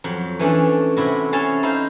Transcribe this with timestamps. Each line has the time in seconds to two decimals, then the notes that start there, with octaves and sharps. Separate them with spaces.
0.04 F2 F#3
0.39 E3 A3 C#4 D4
0.97 C3 E4 F#4
1.33 C#4 C#5 A5 C6
1.63 D#4 E4 C5 F5